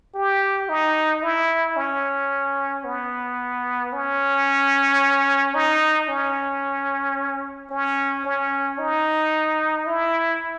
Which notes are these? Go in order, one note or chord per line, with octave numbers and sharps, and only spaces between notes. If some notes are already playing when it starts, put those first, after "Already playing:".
G4
D#4
E4
C#4
B3
C#4
D#4
C#4
C#4
C#4
D#4
E4